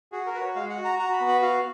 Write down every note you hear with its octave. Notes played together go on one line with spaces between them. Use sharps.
F#4 G#4
A#4
F#4 B4
C#5
G#3 F5
F#5
F#4
A#5
F#4 A#5
B5
B3
B5
F#4 F5